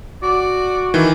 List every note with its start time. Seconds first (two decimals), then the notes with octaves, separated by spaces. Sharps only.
0.23 F#4 D5
0.94 D#3 E3